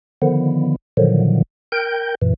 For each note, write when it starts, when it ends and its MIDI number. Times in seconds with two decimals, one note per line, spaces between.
0.22 0.76 50
0.22 0.76 51
0.22 0.76 53
0.22 0.76 59
0.97 1.42 46
0.97 1.42 50
0.97 1.42 51
0.97 1.42 53
0.97 1.42 54
1.72 2.15 70
1.72 2.15 79
1.72 2.15 91
2.22 2.34 42
2.22 2.34 46
2.22 2.34 52